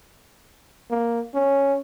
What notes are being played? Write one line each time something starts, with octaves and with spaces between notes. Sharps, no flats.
A#3
C#4